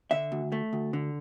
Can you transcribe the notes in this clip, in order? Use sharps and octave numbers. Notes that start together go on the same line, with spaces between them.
D3 E5
D2
A3
D2
D3